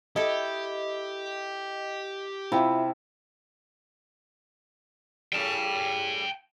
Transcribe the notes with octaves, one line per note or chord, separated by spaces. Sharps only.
E4 G4 A4 D#5
C3 E4 F4 F5 G5
A2 C#3 G3 G5 A5